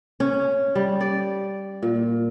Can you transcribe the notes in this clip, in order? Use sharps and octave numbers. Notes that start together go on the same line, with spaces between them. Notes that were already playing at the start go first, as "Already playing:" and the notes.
C#4
G3
D5
A#2